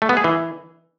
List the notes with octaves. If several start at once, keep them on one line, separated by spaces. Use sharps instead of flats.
A3
B3
G#4
E3